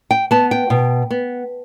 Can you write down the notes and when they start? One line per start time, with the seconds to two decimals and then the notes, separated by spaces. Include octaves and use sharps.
0.11 G5
0.31 B3 A5
0.51 G5
0.70 B2
1.11 B3